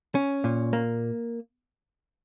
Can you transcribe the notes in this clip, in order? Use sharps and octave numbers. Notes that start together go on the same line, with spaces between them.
C#4
A#2
A#3